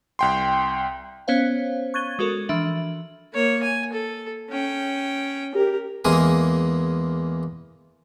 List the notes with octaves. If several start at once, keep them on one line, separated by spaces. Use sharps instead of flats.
C2 G5 C6
B3 C#4 C5 C#5 F5
C#6 F#6 G#6 A6 D#7 G7
G#3 F#4 A4 A#4
E3 F3 D4 E5 F#7
A#3 C#5
G#5
A4
C#4 G5
G4 A#4
E2 G#3 A#3 G#5